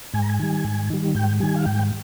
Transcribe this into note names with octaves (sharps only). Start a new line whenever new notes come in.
G#2 G#5
A#5
G#5
D#3 G3
G#2
D#3 G3
G#2 G5
D#3 G3 G#5
F5
G#2 G5